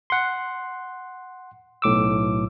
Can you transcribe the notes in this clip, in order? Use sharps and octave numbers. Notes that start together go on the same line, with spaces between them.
F#5 C6
B1 A2 D6 E6